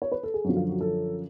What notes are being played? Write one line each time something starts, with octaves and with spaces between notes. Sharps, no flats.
C#5
B4
A4
G#4
F#2 D3 F3 F#4
F4
F#4
A4